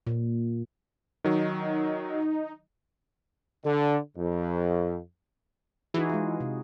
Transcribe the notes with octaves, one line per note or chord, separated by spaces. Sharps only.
A#2
D#3 F#3 D#4
D3
F2
E3 D#4 F#4 G#4
G#3 E4 F4
C3